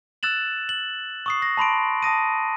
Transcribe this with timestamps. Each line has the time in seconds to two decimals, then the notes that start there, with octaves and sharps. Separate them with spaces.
0.23 E6 F#6 A6 E7 F#7
0.69 F#7
1.26 C#6 D#6 C7
1.42 A#6
1.57 A5 B5 C6 D7
2.02 A5 D#6 A#6 D#7